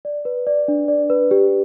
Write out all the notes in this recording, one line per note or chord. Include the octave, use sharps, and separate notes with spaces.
D5
B4
D5
D4
D5
B4
G4